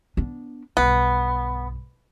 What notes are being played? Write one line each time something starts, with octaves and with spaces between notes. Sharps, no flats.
B3 D4
B1 G2 B3